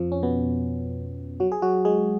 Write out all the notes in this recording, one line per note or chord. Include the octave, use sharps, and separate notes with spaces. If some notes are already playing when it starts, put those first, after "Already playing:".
Already playing: F2 F3
C#4
B2 B3
F#3 F#4
G#4
F#3 F#4
G#3 G#4